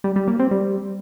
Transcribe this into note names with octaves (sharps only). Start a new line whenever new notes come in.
G3
G3
A#3
C4
G3